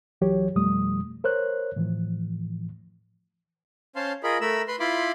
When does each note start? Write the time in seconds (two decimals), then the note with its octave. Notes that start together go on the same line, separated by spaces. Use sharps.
0.21 C2 E3 F#3 G4 C#5
0.55 F2 B2 F3 G3 A3 D#6
1.24 A#4 C5 C#5 F#6
1.76 A2 E3 F3
3.96 C#4 C5 F5 A5 C6
4.23 F4 G#4 A#4 D#5 B5
4.41 A3 A#4 B5 E6
4.68 B4 B5 C6
4.80 E4 F4 B5 C6 D6